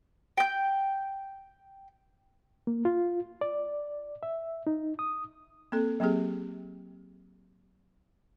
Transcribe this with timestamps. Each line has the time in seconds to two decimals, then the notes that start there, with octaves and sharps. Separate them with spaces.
0.38 G5 G6
2.67 A#3
2.85 F4
3.41 D5
4.23 E5
4.67 D#4
4.99 D#6
5.72 A#3 C4 A4
6.00 F#3 A#3 C4 G4 G#4